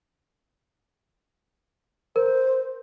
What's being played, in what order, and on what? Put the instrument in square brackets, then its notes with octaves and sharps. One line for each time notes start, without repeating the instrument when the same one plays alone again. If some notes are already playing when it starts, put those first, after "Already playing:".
[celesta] A#4 [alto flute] C5